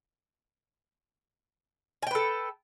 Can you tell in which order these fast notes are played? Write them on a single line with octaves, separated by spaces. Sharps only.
G#5 G5 B4 A4